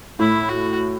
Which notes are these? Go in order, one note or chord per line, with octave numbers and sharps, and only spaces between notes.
A2 E4
F#4